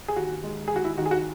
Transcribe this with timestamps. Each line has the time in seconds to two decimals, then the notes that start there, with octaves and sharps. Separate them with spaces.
0.08 G#4
0.16 D#2 F#4
0.44 G#3
0.68 D#2 G#4
0.76 F#4
0.84 E4
0.97 D#3 F#4
1.06 G#4
1.11 F#4